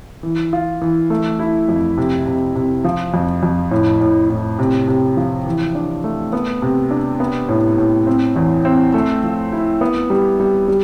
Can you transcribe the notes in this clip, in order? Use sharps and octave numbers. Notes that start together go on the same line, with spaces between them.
E3
F4
E3
A3
E4
F2
C3
C3
C3
F3
F2
F2
A2
A2
A2
C3
C3
F3
E3
D4
A3
B3
C3
D4
B3
A2
A2
C4
E2
C4
A3
F3
E4
B3
G3
G3
G3